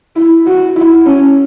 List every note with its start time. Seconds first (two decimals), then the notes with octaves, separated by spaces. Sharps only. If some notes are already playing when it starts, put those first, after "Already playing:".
0.16 E4
0.47 F#4
0.76 E4
1.06 C#4